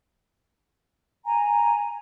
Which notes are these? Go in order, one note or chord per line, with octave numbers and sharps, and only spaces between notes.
G#5 A#5